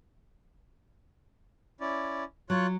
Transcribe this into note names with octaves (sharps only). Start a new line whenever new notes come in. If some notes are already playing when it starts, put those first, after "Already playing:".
C#4 E4 D5
F#3 F4 C#5 F#6